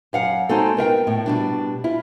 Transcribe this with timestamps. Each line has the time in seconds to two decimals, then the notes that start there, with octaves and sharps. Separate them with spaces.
0.13 F#2 F5 F#5
0.49 G#3 C4 D#4 F#4 A4
0.77 B3 A#4 F5 G5
1.07 A2
1.26 B2 G3 D4
1.84 E4 F4